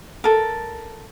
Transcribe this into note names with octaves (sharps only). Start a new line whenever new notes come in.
A4 A#4